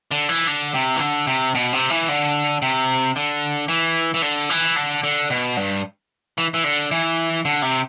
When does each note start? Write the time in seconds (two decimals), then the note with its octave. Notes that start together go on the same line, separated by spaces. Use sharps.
0.11 D3
0.29 E3
0.47 D3
0.74 C3
0.96 E3
1.00 D3
1.27 C3
1.55 B2
1.73 C3
1.90 E3
2.09 D3
2.62 C3
3.16 D3
3.68 E3
4.14 E3
4.22 D3
4.50 E3
4.76 D3
5.04 D3
5.30 B2
5.57 G2
6.38 E3
6.54 E3
6.64 D3
6.91 E3
7.45 D3
7.62 C3